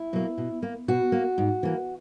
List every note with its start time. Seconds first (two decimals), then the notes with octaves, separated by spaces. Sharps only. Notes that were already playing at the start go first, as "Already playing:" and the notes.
Already playing: E4
0.13 B2 F#3 A#3
0.38 B2
0.63 A#3
0.88 B2 F#4
1.12 A#3
1.38 G#2
1.63 E3 A#3